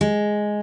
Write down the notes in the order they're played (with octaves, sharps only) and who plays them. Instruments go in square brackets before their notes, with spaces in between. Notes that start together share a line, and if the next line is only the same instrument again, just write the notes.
[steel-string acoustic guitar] G#3